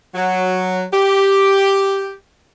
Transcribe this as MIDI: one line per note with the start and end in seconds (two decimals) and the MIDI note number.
0.15 0.84 54
0.93 2.18 67